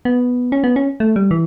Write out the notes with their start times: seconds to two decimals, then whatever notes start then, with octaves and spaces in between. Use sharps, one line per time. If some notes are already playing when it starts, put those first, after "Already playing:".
0.05 B3
0.52 C#4
0.64 B3
0.76 C#4
1.00 A3
1.16 G3
1.31 E3